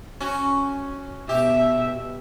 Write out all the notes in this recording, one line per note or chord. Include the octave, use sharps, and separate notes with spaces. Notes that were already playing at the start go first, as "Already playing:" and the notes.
C#4 F#4
B2 G4 E5